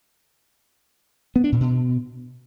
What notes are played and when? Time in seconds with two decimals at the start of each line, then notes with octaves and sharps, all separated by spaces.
1.36 B3
1.44 D4
1.52 A#2
1.60 B2